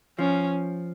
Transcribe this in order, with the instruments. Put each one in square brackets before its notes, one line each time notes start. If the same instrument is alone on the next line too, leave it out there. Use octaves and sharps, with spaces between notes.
[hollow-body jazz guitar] F3 [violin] C#4